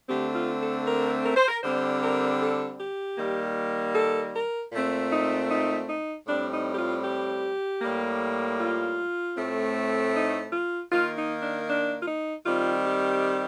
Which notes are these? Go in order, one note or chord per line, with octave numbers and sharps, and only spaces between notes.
D3 A3 C4 G4
F4
A4
A#4
A#4
C5
A#4
D3 G3 C4 C5
A#4
A4
G4
D#3 G3 A#3
A4
A#4
A#2 A3 C4
D#4
D#4
D#4
A2 G3 C4 D4
D#4
G4
F4
G4
A2 G3 A#3
F4
A2 A3 C4
D#4
F4
D#3 A#3 F4
D#4
D4
D4
F4
D#4
D#3 G3 C4 F4
G4